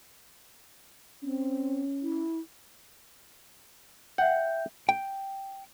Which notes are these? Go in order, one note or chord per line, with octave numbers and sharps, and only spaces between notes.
C4 C#4
E4
E5 F#5 G5 G6
G5